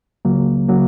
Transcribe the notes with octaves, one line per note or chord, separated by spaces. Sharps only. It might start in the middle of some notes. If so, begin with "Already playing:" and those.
C#2 C#3 F#3 A#3
C#3 F#3 A#3